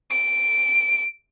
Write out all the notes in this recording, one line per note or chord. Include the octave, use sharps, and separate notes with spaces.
D7